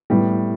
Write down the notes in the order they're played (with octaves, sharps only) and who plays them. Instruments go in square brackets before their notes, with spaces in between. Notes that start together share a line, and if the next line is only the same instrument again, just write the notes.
[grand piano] A2 G3 B3